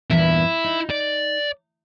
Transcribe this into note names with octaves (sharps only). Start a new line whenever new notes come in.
E2 G2 A#2 E4
D#4
D5